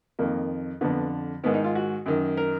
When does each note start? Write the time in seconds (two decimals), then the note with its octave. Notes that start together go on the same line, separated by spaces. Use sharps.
0.19 F2 D#3 A#3
0.81 F2 D3 B3
1.44 G#2 D#3 B3
1.54 D#4
1.64 F4
1.75 F#4
2.06 F#2 D#3
2.37 A#4